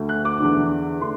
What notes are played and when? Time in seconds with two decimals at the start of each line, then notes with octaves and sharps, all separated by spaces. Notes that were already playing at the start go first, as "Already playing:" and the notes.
Already playing: D2 D3 A3
0.09 F#6
0.25 D6
0.39 E2 D3 A3 D4
1.01 D3 A3 D4 C6